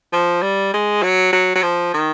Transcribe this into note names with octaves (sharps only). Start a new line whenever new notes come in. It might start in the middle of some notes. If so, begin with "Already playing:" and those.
F3
G3
G#3
F#3
F#3
F#3
F3
D#3